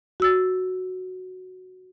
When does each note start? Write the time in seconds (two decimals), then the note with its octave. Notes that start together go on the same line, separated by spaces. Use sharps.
0.20 F#4 E6 A6